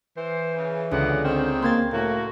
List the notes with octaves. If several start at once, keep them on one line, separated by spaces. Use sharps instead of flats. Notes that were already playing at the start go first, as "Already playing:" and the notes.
E3 C5
C#3
C#2 B2 D3 G#3 F#5
D#3 C4
A#3 C6 G#6 A6
A2 A3 A#3 F#4